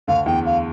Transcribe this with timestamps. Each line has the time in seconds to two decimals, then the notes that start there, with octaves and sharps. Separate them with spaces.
0.08 D2 D3 F5
0.26 E2 E3 G5
0.46 F5